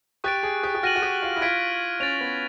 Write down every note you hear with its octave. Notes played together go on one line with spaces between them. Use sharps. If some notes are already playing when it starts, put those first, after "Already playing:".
G4 C#6 F#6 A6 D7
G#4
G4
G4
F#4 F6 A#6 D#7 F#7
F#4
G4
F4
E4
F4 F6 G#6 B6 D7
C#4 A6 D7 F7
B3